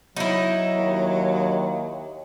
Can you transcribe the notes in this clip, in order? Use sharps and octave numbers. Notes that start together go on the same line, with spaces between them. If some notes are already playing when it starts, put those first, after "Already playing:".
F#3 D#4 E4
D#2